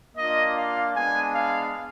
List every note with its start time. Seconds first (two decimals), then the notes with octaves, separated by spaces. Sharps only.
0.16 A#3 D4 F4 D#5
0.56 F5
0.95 G#3 B3 D4 G#5
1.34 F5